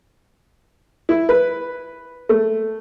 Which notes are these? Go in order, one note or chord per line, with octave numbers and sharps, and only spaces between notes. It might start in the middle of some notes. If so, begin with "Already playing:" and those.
E4
B4
A3